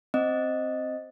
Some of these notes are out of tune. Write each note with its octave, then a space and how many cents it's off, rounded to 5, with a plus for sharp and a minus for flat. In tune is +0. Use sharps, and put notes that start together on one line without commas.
C4 +0 D#5 +0